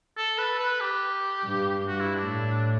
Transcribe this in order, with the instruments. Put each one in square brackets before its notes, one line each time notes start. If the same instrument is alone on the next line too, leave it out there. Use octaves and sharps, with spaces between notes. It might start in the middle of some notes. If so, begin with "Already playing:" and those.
[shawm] A4
B4
B4
G4
[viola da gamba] G2
[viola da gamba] G2 [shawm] F#4
[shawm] E4
D4
[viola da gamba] A2